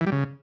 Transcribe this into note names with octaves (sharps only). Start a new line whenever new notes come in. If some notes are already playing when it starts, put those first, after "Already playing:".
E3
G3
C#3